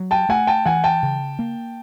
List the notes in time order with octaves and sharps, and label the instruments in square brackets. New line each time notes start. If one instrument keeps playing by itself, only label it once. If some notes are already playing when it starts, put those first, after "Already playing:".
Already playing: [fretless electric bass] F#3
[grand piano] G5 A5
[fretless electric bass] A3 [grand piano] F#5 G#5
[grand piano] G5 A5
[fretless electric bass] E3 [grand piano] F#5 G#5
[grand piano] G5 A5
[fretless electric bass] C#3
A#3